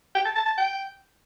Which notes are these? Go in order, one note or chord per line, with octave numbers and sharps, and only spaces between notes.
G5
A5
A5
A5
G5